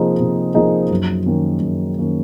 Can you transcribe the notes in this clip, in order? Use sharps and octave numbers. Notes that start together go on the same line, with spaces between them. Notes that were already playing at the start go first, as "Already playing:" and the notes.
Already playing: C3 F3 A#3 D#4 G#4
C3
F3 A#3 D#4 G#4
F#2
D#3 A#3 C#4
F#2
D#3 A#3 C#4